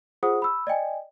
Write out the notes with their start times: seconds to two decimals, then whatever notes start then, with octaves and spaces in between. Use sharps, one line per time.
0.23 F4 G#4 C5 F#5 D#6
0.42 B5 E6
0.67 D5 D#5 G5 G#5